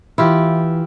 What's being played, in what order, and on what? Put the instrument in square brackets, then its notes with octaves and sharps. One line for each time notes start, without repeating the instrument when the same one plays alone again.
[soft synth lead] E3 [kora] E4 F4 G4